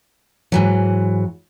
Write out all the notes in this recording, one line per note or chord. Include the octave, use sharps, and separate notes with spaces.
G#2 E3 F#3